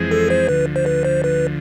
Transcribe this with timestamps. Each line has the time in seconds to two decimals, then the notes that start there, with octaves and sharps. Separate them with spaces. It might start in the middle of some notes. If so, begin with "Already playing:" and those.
Already playing: F2 E3 G#3 C4 G#4
0.11 A4
0.30 C5
0.49 D2 D3 F3 B4
0.76 C5
0.86 B4
1.05 C5
1.24 B4